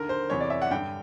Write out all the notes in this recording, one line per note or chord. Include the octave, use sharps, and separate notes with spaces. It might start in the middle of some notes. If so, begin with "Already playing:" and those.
Already playing: D#2 D3 A#4
C5
E2 C3 E3 C#5
D5
E5
F#5
G2 D3 G5